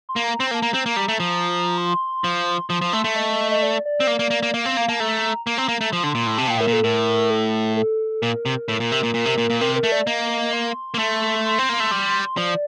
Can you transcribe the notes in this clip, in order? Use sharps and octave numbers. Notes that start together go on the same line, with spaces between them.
C6
A#3
A#5
C4 C6
A#5
A#3
A5
A#3 A#5
C4
A#3
G3
A3
F3
C6
F3
F3 C6
F3
A3
A3
D#5
D#5
D5
D5
C4
A#3
A#3
A#3
A#3
A#3 F5
C4
A#3
A#3 A5
A3 A#5
A#3 A#5
C4
A#3
A3
F3 C6
D3
A#2
A2
C3 A5
A#2 G5
A2 A#4
A#2
A4
A2 A#4
A4
A4
A#2 A#4
C3
A2
A#2
C3
A#2
A#2
C3
A#2
A#2
C3 A#4
A#4
A3
D5
A#3 D#5
C6
A#3
A3
C6
C4
A#3
A3
G3
F3 D5